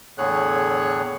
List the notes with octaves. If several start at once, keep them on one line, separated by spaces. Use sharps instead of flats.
E2 A2 D3 G#4 C#5 F#6